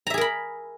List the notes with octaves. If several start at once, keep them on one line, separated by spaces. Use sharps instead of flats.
G#4 A#4 E5 A#5 B5